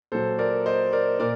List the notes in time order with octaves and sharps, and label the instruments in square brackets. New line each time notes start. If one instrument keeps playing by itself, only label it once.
[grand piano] A#2 F#3 A4 C5
A#4 D5
C5 D#5
A#4 D5
A#2 A#4 D5